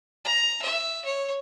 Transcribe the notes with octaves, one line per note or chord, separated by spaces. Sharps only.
A#5
E5
C#5